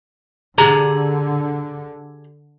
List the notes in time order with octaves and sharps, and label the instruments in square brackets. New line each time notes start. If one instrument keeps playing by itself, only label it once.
[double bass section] D3 [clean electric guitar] G4 G#4 A#5